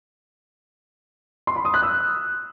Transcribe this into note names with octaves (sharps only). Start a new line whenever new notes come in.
C6
B5
D#6
F#6
E6